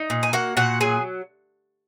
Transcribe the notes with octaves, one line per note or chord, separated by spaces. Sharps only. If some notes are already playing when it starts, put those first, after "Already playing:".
Already playing: D#4
A#2
G#5
A#3 F#4 F#5
A#2 F#4 F#5
F#3 G#4 G#5